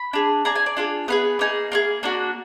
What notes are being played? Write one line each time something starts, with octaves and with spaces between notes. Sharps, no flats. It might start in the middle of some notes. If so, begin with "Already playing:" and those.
Already playing: B5
D4 G#4
D4 G#4 A#5
G#5
D5
D4 F4 G#4
B3 F4 G#4 B4
A#3 D#4 G#4
A#3 F4 G#4
A#3 D4 F#4